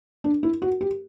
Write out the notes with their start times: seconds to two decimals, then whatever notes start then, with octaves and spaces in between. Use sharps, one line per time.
0.24 D4
0.43 E4
0.62 F#4
0.81 G4